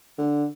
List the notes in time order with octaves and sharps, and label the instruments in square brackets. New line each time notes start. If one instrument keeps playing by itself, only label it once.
[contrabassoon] D3